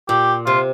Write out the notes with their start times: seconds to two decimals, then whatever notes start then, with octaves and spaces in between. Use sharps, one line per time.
0.09 A#2 G4
0.46 C3 F4